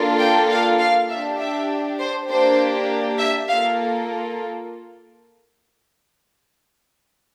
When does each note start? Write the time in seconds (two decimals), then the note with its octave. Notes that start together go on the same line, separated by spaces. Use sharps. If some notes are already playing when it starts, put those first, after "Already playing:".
Already playing: A#3 D4 F4 A4
0.19 G5
0.50 F5
0.79 F5
1.09 D4 G4 E5
1.39 E5
2.00 C5
2.29 A#3 D4 G4 C5
3.20 E5
3.49 A#3 F4 A4 F5